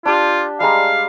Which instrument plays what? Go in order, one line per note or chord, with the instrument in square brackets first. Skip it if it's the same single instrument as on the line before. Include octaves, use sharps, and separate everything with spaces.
[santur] D4 G4 [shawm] F4
[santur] G3 G#3 A#5 [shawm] F5